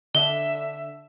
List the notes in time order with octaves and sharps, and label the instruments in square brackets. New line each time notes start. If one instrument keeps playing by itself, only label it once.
[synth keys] D3 [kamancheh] E5 [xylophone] G7